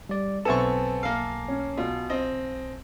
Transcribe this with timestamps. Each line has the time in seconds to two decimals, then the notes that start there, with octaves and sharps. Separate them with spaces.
0.09 G3 D5
0.45 B1 B3 C4 A4 E5 G#5 A5 C#6
1.03 A#3 F5
1.48 C#4
1.77 B2 F4
2.10 C4 D#5